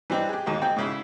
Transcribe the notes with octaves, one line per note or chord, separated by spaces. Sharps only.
E3 G3 C4 D4 D#4
G4 G#4
D#2 G#2 F#3 G#3 A#3
C4 D#4 G#4 D#5 G5
G#2 C#3 E4